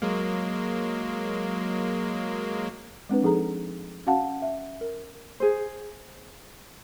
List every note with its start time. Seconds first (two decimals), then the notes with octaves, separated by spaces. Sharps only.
0.02 F#3 G#3 A#3
3.09 G#3 C4 D4 B4
3.22 F3 D#4 G#4 A4 A#5
4.07 C#4 F#4 F5 F#5 A5
4.42 E5
4.81 A#4
5.40 G#4 C5